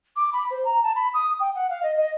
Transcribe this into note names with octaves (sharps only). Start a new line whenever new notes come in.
D6
B5
C5
A#5
A5
B5
D#6
G5
F#5
F5
D#5
D#5